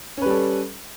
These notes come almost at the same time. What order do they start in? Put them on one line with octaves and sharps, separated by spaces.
C#4 B4 G3 A4